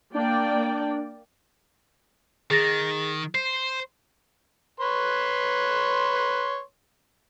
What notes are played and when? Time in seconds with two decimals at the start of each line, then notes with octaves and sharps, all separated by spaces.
0.14 A#3 D4 D5 G5
2.51 D#3 G#4 A6 A#6
3.35 C5 C7
4.80 B4 C#5 C6